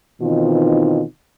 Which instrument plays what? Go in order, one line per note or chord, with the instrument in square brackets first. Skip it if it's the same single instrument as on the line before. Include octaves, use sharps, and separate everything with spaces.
[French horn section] B2 D#3 E3 C4 D#4 F4